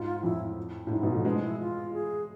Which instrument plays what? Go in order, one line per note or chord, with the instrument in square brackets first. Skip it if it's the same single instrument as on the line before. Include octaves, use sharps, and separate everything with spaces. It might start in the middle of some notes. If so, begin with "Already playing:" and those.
Already playing: [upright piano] G#2 [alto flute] F4
[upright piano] F2 A2 [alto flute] E4
[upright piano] A2
[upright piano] G#2 [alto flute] E4
[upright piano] G#2 B2
F3 A3
[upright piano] G#3 B3 [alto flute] D4
[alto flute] E4
F4
G#4